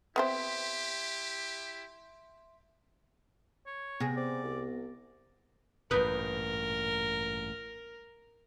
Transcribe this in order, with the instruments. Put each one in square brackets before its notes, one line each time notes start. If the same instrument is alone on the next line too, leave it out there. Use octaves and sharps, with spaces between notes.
[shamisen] B3 C4 C5 [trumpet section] E4 G4 [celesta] E5 C6
[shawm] C#5
[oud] C3 G#4 [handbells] B3 A#6
[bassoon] C4 [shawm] D5
[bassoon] C2
[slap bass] A1 G2 A#2 [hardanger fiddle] A#4 [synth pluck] B4 D#6 G6